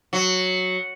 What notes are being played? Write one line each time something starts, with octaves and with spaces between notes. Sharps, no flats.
F#3